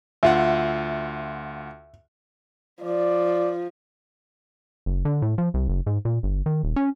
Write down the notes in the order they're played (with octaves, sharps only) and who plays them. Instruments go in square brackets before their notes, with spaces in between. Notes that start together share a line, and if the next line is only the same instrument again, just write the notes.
[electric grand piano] D2 F4 F#5 [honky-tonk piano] E5
[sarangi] F3 [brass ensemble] D5
[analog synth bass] F#1
D3
A2
F3
C2
F#1
G#2
A#2
G1
D#3
D#1
C#4